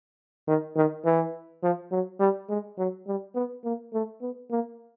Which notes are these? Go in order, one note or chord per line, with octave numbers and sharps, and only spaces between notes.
D#3
D#3
E3
F3
F#3
G3
G#3
F#3
G3
B3
A#3
A3
B3
A#3